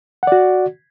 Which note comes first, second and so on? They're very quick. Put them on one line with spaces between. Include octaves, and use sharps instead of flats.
F#5 D5 F#4